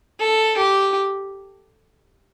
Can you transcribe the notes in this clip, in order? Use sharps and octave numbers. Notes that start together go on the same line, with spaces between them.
A4
G4